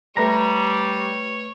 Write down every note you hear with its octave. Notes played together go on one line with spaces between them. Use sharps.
G3 A3 B4 C#5 A#5 B5